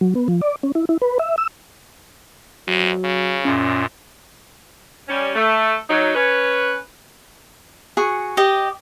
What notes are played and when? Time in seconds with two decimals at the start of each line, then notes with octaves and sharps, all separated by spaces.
0.01 F#3
0.15 B3
0.28 F3
0.41 D5
0.63 C#4
0.75 E4
0.89 E4
1.02 B4
1.19 E5
1.38 E6
2.67 F2 F#3
3.04 C#3
3.45 F#2 A#2 C#4
5.08 G3 C#4
5.35 A3
5.90 F#3 D#4
6.14 C#4 B4
7.97 F#4 G#4 C#6
8.37 G4 D#5